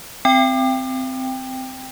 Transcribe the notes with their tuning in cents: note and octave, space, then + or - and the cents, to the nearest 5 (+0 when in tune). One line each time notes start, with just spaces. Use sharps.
C4 -15 G5 +10